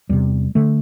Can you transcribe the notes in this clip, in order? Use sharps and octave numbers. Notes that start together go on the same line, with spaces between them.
E2 C3 G3
D3 A3